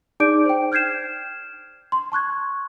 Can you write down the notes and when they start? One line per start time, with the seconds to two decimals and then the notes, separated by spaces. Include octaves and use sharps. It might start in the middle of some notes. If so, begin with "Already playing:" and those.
0.20 D#4 G#4 D5 D6 G6 D7
0.45 C5 G5
0.72 F6 G6 G#6 C7 E7
1.92 C6
2.12 A5 C#6 F#6 G#6